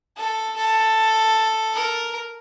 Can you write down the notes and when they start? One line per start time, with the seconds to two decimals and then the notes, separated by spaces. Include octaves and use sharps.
0.17 A4
0.57 A4
1.74 A#4